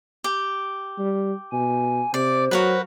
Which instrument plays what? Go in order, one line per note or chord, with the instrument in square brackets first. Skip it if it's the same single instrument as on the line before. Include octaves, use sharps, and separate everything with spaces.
[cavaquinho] G4
[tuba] G3
[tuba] B2 [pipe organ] G#5
[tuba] C3 [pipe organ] C5 [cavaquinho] D5
[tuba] F#3 [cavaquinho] F#4 A#4 B4